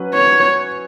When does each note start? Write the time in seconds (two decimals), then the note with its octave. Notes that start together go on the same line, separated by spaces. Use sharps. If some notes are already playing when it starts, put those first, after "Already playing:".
Already playing: F#3 C#4 B4
0.14 C#5